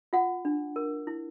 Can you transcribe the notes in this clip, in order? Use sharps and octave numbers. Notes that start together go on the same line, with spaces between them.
F4 F#5
D4
A#4
E4